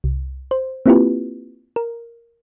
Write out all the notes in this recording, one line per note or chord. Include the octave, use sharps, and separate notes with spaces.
C2
C5
A#3 C4 E4 F4 G4 B4
A#4